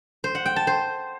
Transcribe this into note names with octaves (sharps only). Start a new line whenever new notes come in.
C5
F#5
G5
A5
C5